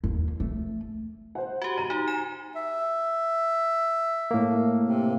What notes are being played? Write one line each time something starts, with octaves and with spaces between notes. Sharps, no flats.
D#2
A3
C5 F#5
F#4 G4
A#5 D#7
D#4 G4
G#5 E7
E5
A2 A#3
C3